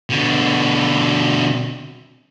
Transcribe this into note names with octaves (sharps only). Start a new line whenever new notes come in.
B2 D3